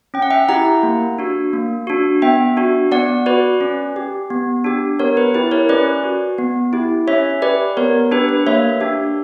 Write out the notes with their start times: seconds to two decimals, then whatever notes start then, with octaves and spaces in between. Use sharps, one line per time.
0.14 C#4 G5
0.22 F#5
0.30 E5 G5
0.49 E4 G4 F#5 A#5
0.83 A#3
1.18 D4 F#4
1.53 A#3
1.87 D4 F#4
2.22 B3 E5 G5
2.57 D4 F#4
2.92 B3 D5 F#5
3.26 F#4 B4 D5
3.61 C#4
3.96 G4
4.30 B3
4.64 D4 G4
4.99 B3 A#4 C#5
5.17 B4
5.34 E4 G4 B4
5.51 A#4 C#5
5.69 C#4 B4 D5
6.04 F#4
6.38 B3
6.73 E4 G4
7.08 C#4 C#5 E5
7.42 G4 B4 D5
7.77 B3 A#4 C#5
8.11 D4 G4 B4
8.29 B4
8.47 A#3 C#5 E5
8.81 D4 G4